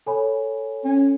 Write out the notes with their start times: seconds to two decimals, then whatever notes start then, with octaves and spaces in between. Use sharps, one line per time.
0.06 A4 C#5 G#5 B5
0.85 C#4